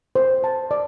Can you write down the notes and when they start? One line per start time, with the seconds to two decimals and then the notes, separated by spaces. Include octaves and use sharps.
0.16 C5
0.44 A5
0.71 D5